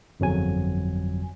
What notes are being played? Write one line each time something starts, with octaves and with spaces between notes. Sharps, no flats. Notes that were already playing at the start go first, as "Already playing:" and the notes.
G1 F2 F#3 G#5